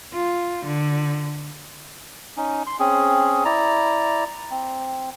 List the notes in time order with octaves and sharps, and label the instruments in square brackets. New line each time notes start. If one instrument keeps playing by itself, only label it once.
[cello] F4
D3
[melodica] C#4 D#4
C6
C4 C#4 G#4
E4 D5 A#5
C4